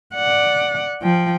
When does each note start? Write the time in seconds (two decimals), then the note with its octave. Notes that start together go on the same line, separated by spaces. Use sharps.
0.15 D5 F#5
1.02 F3 G5